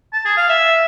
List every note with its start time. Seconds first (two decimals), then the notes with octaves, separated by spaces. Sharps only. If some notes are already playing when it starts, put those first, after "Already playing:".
0.13 A5
0.25 G#4
0.37 F5
0.49 E5